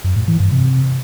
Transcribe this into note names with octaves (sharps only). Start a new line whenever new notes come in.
F#2
A2
E3
G2
C3